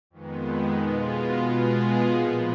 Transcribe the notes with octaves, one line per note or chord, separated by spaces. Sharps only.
F2 D#3 G#3 B3
B2 G#3 B3 F4
B2 G#3 B3 F4 G#4
A#2 F3 B3